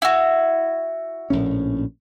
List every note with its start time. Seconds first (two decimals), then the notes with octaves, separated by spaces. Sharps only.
0.02 E4 F#4
1.30 A#1 A2 C#4